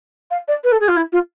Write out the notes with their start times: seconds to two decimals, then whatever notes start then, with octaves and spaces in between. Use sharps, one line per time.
0.30 F5
0.48 D5
0.63 B4
0.71 A4
0.80 G#4
0.88 F4
0.96 E4
1.12 F4